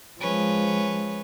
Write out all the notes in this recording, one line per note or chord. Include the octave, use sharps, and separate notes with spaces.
F3 G#3 C#4 B4